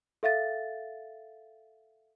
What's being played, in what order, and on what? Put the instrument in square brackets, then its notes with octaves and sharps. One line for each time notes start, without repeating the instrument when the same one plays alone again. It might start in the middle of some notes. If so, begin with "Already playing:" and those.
[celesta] A4 E5 F5 A6